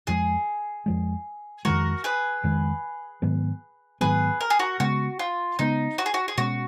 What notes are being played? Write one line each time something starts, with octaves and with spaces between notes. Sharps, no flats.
F2 F3 G#3 G#4
F2 F3 G#3
F2 D#3 G#3 F#4 A#4
G#4 B4
F2 D#3 G#3
G#2 D#3 F#3 B3
G#2 D#3 F#3 B3 G#4 B4
A#4
G#4
F#4 A#4
C#3 G#3 B3 F#4
F4
C#3 G#3 B3 D#4
F#4
G#4
F#4
G#4
B2 G#3 C#4 F#4